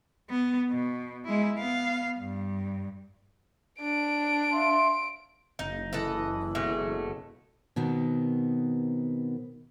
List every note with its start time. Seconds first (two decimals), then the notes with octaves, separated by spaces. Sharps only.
0.30 B3
0.70 B2
1.25 G#3 E4
1.58 B3 F5
2.18 G2
3.81 D4 D7
4.52 E5 F5 C6
5.59 F#1 D#4
5.93 E3 A4 B4 D#5
6.55 B2 G#3 A3
7.76 B2 D#3 B3 C4